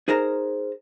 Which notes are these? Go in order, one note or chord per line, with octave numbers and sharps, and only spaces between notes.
D#4 G#4 A#4 C5 A#5